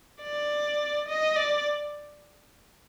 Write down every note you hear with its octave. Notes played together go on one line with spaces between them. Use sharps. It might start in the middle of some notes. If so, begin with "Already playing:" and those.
D5
D#5
D5